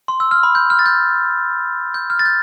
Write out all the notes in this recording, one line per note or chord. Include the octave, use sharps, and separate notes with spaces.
C6
E6
F6
B5
G6
F6
A6
G6
G6
F6
A6
G6